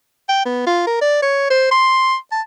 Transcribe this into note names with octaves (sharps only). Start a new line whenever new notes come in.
G5
B3
F4
A#4
D5
C#5
C5
C6
A5